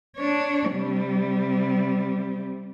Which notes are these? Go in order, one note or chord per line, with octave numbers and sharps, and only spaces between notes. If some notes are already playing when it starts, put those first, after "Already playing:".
D4 C#5
C3 G3